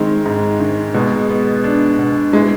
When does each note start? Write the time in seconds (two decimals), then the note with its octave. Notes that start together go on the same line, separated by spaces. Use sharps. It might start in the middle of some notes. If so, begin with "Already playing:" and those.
Already playing: D#3 G#3 C4
0.26 G#2
0.60 D#3
0.94 B2 G#3
1.29 B3
1.64 D4
1.99 B2
2.33 G#3 E4